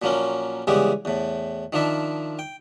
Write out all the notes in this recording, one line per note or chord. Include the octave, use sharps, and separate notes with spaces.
A#2 F3 F#3 A#3 C#4
C#3 E3 G3 G#3 B3 G4
E2 A2
D#3 F3 D4 E5
G5